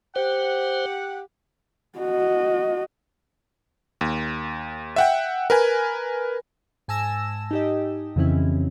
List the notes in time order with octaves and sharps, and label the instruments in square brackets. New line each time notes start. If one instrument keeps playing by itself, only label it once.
[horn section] G4 F#5 [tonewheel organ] C5
[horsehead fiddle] F#4 D#5
[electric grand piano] D#2
E5 F#5 G5
A#4 B4 G#5
[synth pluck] G#2 G#5 A5 E6 A#6 E7
D#4 G4 D#5
F2 C#3 E3 C4 C#4 E4